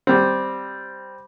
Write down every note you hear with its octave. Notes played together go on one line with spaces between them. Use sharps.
G3 C4